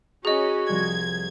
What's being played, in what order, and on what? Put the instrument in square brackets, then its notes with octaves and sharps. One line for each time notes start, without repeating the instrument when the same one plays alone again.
[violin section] C#4 [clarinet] F#4 [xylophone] G#4 D#5 [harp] G#5 A#5
[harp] C2 F3 A#6 [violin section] G#6